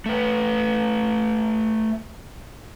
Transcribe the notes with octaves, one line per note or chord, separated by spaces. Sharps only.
A3 B4